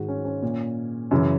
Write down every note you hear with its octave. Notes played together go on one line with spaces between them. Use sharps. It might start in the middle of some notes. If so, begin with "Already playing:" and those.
Already playing: G#2 D#3 F#4
C#4
C#4
A#2
F#2 C#3 E3